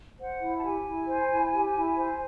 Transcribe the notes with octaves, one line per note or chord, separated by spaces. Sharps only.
C5 F#5
E4
A5
G4 G#5
E4
C5
E4
G4
E4
C5